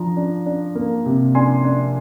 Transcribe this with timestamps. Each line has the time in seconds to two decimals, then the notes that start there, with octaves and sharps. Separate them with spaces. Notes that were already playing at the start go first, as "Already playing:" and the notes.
Already playing: F3 D4 A#5
0.17 D4
0.46 D4
0.75 A#3
1.06 C3
1.35 D4 G#5 C6
1.64 D4